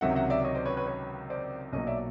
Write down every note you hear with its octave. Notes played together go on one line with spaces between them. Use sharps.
C#2 C3 D#3 F#3 E5 F#5
E5 F#5
D5 E5
C#5 D#5
C5 D5
B4 C#5
B4 C#5
B4 C#5
C5 D5
B1 A#2 F#3 C#5 D#5
D5 E5